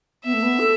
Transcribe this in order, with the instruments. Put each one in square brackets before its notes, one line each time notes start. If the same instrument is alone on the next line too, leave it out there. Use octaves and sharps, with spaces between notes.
[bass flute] B3 [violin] E5
[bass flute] A3
B3
A4